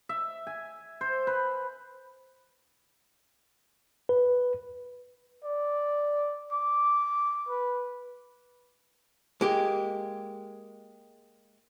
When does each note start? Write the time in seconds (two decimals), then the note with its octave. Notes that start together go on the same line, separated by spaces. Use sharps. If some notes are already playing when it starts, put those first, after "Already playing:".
0.09 E5
0.47 G#5
1.01 C5
1.27 B4
4.09 B4
5.44 D5
6.52 D6
7.49 B4
9.41 G#3 A#3 G4